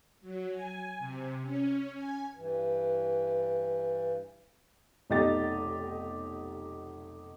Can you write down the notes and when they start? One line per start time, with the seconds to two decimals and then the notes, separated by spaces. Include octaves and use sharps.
0.21 F#3
0.50 G#5
0.99 C3
1.42 C#4
1.94 G#5
2.35 G2 E3
5.10 F1 B1 D#4 G4 D#5 A6